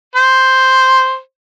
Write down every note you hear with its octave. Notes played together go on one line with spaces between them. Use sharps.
C5